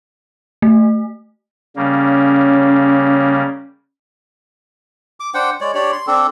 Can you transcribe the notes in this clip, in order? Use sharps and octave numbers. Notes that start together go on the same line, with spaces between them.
A3
C#3 G3 A#3 C#4
D6
D4 C5 F#5 G5
G#3 C#5 D5
D4 G4 C#5 D5
C6
C4 D4 A4